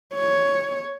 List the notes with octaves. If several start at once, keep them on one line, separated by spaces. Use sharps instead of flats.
C#5